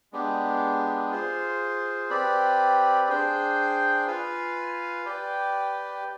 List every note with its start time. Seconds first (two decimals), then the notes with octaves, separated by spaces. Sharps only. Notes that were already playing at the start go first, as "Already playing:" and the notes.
0.13 G#3 B3 D4 G4
1.11 F4 G#4 C5
2.10 C4 G4 B4 D5
3.08 D4 G#4 C5 G5
4.06 F4 B4 F5 G#5
5.06 G4 B4 D5 G5